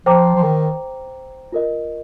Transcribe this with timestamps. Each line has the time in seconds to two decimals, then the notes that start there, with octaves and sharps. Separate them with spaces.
0.06 F3 C5 G5 A#5 D6
0.35 F3
0.43 D#3
1.52 F4 A#4 D#5